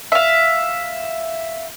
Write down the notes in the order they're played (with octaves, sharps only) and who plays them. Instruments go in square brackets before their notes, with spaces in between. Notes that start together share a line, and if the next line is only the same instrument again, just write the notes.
[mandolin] E5 F5